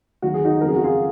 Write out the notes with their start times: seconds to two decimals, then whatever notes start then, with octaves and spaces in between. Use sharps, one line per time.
0.22 D#2 D#3 F#3 F#4
0.34 G#4
0.45 D#4 F#4
0.61 F2 C#3 F#3 A#4
0.68 G#4
0.76 F#4
0.84 F4 G#4